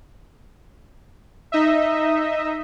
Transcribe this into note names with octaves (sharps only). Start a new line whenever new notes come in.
D#4 D#5 E5